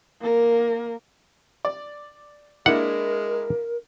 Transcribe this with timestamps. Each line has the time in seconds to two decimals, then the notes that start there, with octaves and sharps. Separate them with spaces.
0.22 A#3 A#4
1.65 D5
2.66 G#3 A#3 D4 E4 A#4 F#5